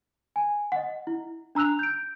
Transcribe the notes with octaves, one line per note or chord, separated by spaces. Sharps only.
G#5
D#5 F#5
E4
D4 A#5 E6 F#6 F7
G6 D7